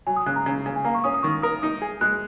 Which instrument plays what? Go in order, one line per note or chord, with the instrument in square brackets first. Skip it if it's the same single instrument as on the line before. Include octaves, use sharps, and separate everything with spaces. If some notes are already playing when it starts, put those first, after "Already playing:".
[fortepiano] F#3 [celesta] G#5
[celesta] D#6
[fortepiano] C#3 [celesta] F#6
[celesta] A#5
[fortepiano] C#3
C#3
[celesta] G#5
[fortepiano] A#3 [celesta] A#5
[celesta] C#6
[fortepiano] C#4 [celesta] D#6
[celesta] D#6
[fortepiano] D#3 [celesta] C#6
[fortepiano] A#4 [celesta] D#6
[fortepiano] D#4 [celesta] D#6
[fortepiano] G#4
[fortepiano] G#3 [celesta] F#6